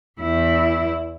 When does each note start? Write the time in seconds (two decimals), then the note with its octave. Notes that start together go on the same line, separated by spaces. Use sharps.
0.20 E2 E4